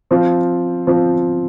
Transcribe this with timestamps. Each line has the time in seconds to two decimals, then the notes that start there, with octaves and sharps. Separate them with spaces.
0.11 F3 C4 F4
0.87 F3 C4 F4